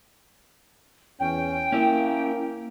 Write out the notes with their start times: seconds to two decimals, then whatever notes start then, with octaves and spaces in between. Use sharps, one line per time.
1.20 E2 C#4 G5
1.72 A#3 C#4 E4